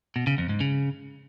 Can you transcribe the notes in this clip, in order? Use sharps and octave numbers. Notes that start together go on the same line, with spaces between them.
B2
C#3
F2
G#2
C#3